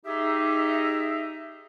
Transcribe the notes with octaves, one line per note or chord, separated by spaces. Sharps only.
D#4 G4 G#4 E5